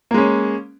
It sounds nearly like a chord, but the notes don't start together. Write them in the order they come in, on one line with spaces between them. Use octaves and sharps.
A#3 G#3 C#4